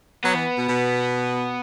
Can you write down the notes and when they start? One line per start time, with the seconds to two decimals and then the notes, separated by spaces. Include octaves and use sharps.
0.24 F#3 B3
0.35 E3
0.58 B2
0.68 B2